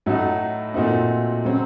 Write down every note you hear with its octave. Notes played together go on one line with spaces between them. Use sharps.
A2 F#3 A3 D#4 F#4
A#2 A3 C4 D#4 F#4
C#3 F#3 C4